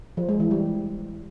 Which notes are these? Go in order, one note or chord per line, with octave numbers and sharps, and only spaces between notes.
F3
G#3
E3
G3